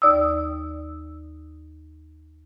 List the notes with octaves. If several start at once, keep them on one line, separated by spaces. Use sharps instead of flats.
D#2 D5 D#6 E6